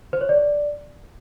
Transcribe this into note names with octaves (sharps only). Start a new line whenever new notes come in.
C5
C#5
D5